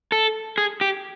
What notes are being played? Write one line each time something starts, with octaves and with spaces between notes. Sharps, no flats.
A4
G#4
G4